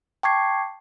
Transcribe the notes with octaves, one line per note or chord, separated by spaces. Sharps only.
G5 A5 C#6 D6 G#6 C7